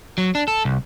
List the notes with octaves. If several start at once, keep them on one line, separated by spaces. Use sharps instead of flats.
F#3
D4
A4
C2